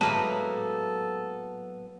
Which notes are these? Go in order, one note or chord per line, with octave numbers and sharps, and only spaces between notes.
A2 F#3 G#3 A#3 B3 A4 B4 A5